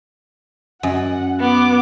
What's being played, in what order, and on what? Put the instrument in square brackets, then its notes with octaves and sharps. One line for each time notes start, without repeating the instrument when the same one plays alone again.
[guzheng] F#2 [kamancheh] F#5
[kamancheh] B3 D6